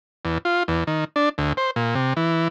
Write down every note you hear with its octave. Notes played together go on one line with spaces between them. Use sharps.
E2
F4
E2
D#3
D4
D2
C5
A#2
C3
E3